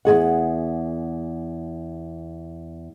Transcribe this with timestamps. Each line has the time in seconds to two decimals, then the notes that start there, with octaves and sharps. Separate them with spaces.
0.05 E2 C#3 G#4 F#5